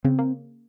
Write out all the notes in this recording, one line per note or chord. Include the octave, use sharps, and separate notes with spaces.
C#3 C4
A#3